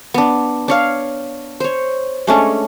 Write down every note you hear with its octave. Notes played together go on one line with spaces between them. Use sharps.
B3 D4
D4 C#5 F5
C5 C#5
G#3 A3 C#4 D4